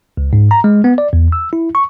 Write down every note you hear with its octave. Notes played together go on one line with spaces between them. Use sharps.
C#2
G#2
A#5
G#3
B3
D5
E2
E6
E4
C#6